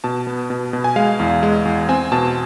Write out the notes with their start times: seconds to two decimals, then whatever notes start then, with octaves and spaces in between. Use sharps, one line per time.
0.04 B2 A5
0.27 B3
0.50 B2
0.73 B2
0.84 G#5
0.96 G#3 F5
1.19 E2
1.43 G#3
1.65 E2
1.89 C4 G#5
2.12 B2 A5